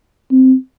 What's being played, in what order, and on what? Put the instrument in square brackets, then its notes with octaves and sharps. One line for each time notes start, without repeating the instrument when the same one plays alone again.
[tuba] C4